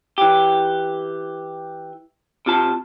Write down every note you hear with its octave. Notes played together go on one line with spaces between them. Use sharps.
E3 G4
C3 F4 A5